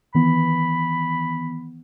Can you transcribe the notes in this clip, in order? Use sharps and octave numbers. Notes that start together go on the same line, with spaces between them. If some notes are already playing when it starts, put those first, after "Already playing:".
D#3 E3 B3 B5